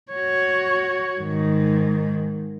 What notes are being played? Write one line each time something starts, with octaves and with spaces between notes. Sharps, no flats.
F#4 C#5
G#2 D#3